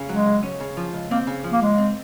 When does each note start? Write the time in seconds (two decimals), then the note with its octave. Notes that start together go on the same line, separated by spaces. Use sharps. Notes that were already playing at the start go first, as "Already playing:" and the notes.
Already playing: C#3
0.09 F#3 G#3
0.26 C#2
0.43 C#4
0.60 C#3
0.77 F3
0.93 C#2
1.11 A#3 C4
1.27 C#3
1.44 F3
1.52 A#3
1.62 C#2 G#3
1.78 C4